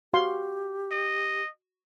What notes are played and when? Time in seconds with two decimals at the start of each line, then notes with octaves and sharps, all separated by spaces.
0.14 F#4 G4 F5 C6
0.91 D#5